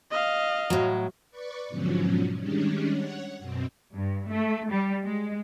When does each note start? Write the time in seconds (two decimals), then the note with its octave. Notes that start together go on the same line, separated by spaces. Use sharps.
0.11 D#5 F5
0.70 A2 F#3
1.31 B4 D5 C#6
1.69 G#2 B2 D3 F3 F#3 C#4
2.38 D#3 G3 G#3 C#4 D4
2.91 C#5 F#5
3.38 F#2 B2 C4
3.96 G2
4.30 A3
4.72 G3
5.05 G#3